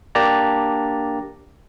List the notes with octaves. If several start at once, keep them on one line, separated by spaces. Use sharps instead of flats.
A#3 D4 G4 D5 A5 A#5